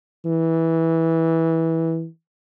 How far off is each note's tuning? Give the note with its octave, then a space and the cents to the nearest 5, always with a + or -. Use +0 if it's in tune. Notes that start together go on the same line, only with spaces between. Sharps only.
E3 -15